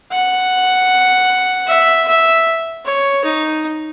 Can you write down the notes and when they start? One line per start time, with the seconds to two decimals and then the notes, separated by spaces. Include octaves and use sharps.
0.11 F#5
1.68 E5
2.08 E5
2.85 C#5
3.24 D#4